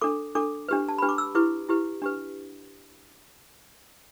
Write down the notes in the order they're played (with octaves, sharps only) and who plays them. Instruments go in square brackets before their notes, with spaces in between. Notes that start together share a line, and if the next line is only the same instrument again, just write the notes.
[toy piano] D4 A4 D6
D4 A4 D6
D4 G4 B4
A5
D4 G4 B4 B5
D6
E6
E4 G4 B4 D6
E4 G4 B4
D4 G4 B4